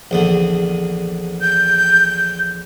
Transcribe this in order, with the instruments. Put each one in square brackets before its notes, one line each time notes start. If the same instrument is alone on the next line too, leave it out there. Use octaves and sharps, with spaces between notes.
[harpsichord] A#1 E2 D3
[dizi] G6